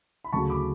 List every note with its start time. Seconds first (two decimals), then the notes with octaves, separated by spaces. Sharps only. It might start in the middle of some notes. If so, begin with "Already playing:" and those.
0.24 B5
0.32 D2 C#3 F#3 A5 C#6
0.50 B5 D6